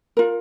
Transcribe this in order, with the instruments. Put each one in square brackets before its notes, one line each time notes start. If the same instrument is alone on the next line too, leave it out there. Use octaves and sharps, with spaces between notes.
[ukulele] F4 A#4